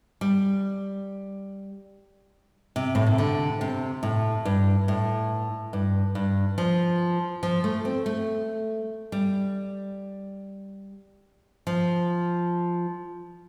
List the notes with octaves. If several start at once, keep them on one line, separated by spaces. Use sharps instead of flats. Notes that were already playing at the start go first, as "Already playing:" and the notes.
G3
C3
A2
C3
D3
C3
A2
G2
A2
G2
G2
F3
F3
A3
C4
A3
G3
F3